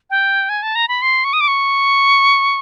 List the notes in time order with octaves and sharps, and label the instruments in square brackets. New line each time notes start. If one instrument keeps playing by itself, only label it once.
[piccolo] G5
G#5
A5
A#5
B5
C6
C#6
D#6
D6
C#6